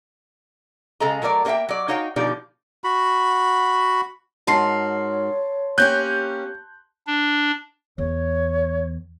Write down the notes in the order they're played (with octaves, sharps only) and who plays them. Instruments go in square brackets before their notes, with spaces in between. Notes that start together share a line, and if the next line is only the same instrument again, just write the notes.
[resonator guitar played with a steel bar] C#3 G#3 A4 D#5 A#5
F#3 A3 A#4 C#5 D5
A#3 A4 A#4 E5 G5
F#3 D5
D#4 F#4 C#5 F5 G5
B2 D3 F3 D#4 G4 D5
[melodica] F#4 B5
[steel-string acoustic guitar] G#2 F#4 A#4 [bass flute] C#5 [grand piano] A5 C6 C7
[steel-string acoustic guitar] A#3 C#4 G4 [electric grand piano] F#6 G6
[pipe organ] D4
[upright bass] E2 [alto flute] C#5